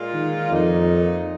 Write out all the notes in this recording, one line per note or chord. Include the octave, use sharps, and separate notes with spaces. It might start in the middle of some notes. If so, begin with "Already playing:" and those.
Already playing: A#2 G#3 F4
D#3
F2 A#2 A#3 D#4